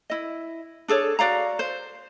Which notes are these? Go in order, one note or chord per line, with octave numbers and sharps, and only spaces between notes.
E4 D#5
D4 G#4 A4 C#5
F#4 D5 F5 A#5
C5